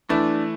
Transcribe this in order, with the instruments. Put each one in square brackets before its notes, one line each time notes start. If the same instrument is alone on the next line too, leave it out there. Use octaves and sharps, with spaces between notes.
[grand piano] E3 A3 E4 [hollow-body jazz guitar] D4